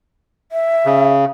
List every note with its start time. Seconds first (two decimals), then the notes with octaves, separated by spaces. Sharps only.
0.52 E5
0.85 C#3